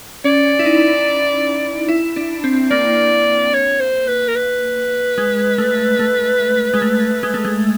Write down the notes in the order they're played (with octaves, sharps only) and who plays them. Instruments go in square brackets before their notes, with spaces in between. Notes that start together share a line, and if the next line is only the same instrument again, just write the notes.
[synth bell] C#4 [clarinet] D5
[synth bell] E4
D#4
E4
D4
C4
[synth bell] A#3 [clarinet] D5
[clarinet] C#5
C5
B4
A#4
B4
[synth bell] G#3
A3
A3
G#3
A3
G#3
A3
G#3